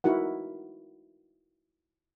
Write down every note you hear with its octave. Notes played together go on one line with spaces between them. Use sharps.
D#4 E4 F#4 A#4 F#5